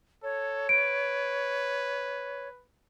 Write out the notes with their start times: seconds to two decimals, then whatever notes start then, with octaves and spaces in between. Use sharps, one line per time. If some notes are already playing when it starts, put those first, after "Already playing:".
0.23 A4 C#5
0.69 B4 D7